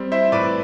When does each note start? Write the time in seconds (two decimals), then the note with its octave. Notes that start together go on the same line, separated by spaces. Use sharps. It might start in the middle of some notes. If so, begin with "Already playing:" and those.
Already playing: G3 C4
0.12 E4 C5 E5
0.32 A2 B4 D5